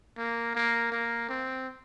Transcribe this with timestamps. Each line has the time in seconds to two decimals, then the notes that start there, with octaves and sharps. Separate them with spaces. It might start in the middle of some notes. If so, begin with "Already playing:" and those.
0.18 A#3
0.55 A#3
0.92 A#3
1.29 C4